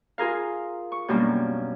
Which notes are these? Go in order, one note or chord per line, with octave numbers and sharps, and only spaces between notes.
F4 G#4 A#4 F5
C#6
F#2 B2 G3 A#3 D4